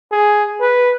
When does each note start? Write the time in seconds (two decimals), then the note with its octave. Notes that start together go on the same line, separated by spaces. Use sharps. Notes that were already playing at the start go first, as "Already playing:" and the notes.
0.12 G#4
0.61 B4